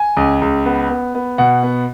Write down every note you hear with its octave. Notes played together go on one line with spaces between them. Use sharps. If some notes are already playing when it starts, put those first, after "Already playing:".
Already playing: G#5
C#2
C#2
B3
B3
B3
B2 F#5
B3